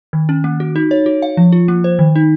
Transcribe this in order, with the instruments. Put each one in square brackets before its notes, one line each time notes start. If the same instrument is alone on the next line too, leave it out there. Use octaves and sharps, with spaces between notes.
[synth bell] D#3
C#4
A#3
F#4
D#4
C#5
F#4
F5
F3
F4
A#3
C5
D#3
D#4